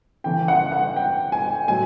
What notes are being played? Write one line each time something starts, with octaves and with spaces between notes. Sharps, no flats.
C#3 E3 A3 G5
F#5
F#5
G5
G#5
A2 F#3 G#5